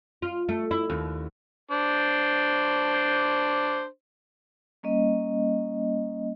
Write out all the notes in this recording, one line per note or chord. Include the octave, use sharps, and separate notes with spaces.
F4
A3
E4
D#2
D4 C5
G3 A#3 C#4 D#5